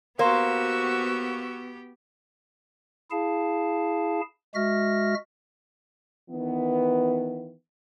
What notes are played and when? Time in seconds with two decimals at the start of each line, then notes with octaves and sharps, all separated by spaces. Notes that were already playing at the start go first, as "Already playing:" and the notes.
0.19 A#3 B3 F#4 G4 C5 C#6 E6
3.11 E4 G#4 F5 A5
4.55 G#3 F#4 E5 F6 A#6
6.30 D#3 E3 B3